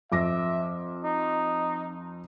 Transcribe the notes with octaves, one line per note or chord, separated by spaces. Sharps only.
F2 E5 D6 A#6
D#4